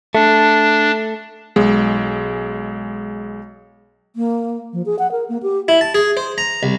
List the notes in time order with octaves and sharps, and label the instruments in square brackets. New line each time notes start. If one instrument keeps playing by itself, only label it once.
[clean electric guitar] A3 [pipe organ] D4
[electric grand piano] B1 G#3
[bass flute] A#3
F3
G#4
F#5
A#4
A#3
G4
[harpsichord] E4
A5
G#4
C5
A#5
C2